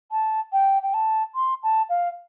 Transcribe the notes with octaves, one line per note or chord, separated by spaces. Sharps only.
A5
G5
G5
A5
C6
A5
F5